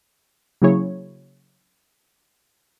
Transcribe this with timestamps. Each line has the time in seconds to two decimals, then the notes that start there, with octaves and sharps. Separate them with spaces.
0.62 C#3 F#3 A#3 E4 G#4 C#5